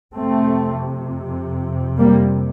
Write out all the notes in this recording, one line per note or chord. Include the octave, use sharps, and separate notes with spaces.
F2 C3 A3 C4
G3 A#3